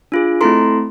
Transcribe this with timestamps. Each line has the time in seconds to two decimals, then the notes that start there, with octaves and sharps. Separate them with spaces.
0.12 D4 F4 G#4
0.41 A3 C4 E4 A4 A#5 C6